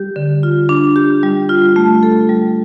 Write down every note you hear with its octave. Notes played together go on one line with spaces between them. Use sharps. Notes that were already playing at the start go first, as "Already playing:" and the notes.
Already playing: G3 G4
D3
F4
D4
G4
G3
F4
A3
A4
G3